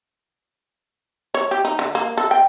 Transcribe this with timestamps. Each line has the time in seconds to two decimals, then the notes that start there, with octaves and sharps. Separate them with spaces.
1.34 C#5
1.51 G4
1.65 D#4
1.79 D3
1.95 A#3
2.17 A4
2.31 G5